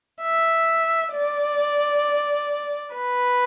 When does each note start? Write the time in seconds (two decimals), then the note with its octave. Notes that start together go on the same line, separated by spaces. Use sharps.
0.22 E5
1.13 D5
2.95 B4